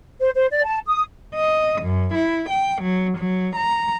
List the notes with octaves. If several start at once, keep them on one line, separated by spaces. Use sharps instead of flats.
C5
C5
D5
A5
D#6
D#5
F#2
E4
G5
F#3
F#3
A#5